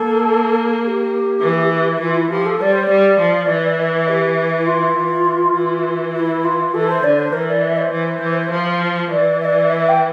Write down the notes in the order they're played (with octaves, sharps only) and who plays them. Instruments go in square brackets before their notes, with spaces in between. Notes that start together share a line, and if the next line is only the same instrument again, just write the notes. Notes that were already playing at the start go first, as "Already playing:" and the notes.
Already playing: [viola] A#3 [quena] A4
[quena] A4
G4
[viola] E3
[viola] E3 [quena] F4
[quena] E4
[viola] F3 [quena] G4
[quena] A4
[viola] G3 [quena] D5
[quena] C5
D5
[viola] G3
F3
E3
[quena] E5
G4
E4
F4
[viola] E3
E3
[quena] F4
E4
F4
[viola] E3 [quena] A4
[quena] C5
[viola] D3 [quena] D5
[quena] C5
[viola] E3 [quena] A#4
[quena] D5
E5
D5
C5
[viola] E3
E3
F3
[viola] E3 [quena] D5
[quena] E5
D5
E5
G5